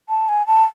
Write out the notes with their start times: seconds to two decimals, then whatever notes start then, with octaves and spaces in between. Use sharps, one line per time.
0.09 A5
0.29 G#5
0.47 A5